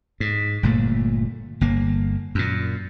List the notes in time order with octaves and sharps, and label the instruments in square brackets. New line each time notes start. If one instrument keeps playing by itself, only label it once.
[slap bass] G#2
G1 A#2 A3
G1 A#3
F#2 A#2